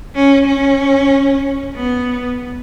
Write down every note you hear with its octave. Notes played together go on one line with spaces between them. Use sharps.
C#4
C#4
B3